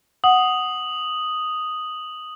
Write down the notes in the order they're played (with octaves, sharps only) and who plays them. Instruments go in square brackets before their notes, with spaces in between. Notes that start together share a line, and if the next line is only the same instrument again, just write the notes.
[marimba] F#5 [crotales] D#6 F#7